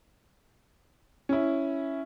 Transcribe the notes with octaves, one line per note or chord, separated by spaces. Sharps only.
C#4 E4